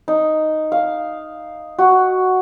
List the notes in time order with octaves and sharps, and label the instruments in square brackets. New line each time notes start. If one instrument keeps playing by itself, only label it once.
[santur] D#4
F5
F#4